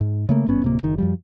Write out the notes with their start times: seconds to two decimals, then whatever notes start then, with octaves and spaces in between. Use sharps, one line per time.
0.01 G#2
0.29 C#3 A3 A#3
0.47 G#1 G2 B3 C#4
0.62 D1 C3 A#3
0.83 F#1 D#3
0.98 F#2 F3 G3